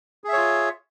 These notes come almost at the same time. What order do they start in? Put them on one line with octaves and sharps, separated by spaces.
G#4 E5 C#5 F4